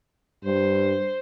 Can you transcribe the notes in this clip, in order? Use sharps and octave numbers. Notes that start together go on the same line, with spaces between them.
G2 C5